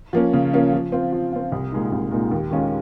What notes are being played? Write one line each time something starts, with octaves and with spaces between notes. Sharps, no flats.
F3 A#3 C#4
C#3
F3 A#3 C#4
F3
C4 F4
F3
C4 F4
C2
A#2 G#3 D#4
C2
A#2 G#3 D#4
D#2
D#3 G#3 C#4 F4